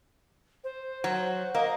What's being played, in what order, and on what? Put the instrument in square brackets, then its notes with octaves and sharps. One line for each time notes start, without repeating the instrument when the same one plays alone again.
[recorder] C5
[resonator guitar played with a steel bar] F#3
[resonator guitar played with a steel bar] A#3 [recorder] D#5